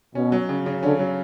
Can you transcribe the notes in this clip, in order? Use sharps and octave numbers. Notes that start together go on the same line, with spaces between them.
B2 C#4
F#3
C#3
C#3
D3 C#4
F#3